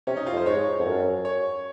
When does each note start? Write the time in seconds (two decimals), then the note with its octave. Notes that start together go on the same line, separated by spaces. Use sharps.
0.07 C3 C#4
0.17 D#4
0.27 F4
0.33 F2
0.37 C5
0.46 G#2 C#5
0.79 F2
0.86 F#2
1.25 C#5